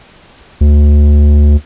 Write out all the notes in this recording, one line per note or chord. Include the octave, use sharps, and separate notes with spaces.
D2